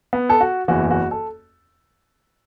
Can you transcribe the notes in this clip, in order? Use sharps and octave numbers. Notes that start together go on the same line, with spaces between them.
B3
A4
F#4
F#1 E2 E3 F#4
F#4
A4